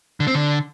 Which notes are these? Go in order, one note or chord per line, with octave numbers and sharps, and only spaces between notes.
D3
C4
D3